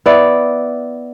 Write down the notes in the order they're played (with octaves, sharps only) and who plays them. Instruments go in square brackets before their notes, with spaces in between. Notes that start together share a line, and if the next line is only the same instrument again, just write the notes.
[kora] B3 E4 D5